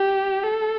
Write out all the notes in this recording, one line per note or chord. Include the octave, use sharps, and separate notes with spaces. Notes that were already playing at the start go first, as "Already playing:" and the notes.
Already playing: G4
A4